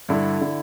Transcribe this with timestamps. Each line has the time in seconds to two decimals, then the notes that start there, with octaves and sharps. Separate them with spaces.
0.09 G2 D3 E4
0.41 D3